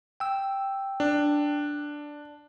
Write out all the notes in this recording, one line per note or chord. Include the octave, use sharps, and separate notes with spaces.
G5 E6
D4